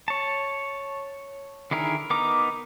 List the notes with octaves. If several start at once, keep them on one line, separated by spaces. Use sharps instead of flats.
C#5 A5
D3 D#3 E4 G#4 A#4
B3 D#4 A#4 A#5 D6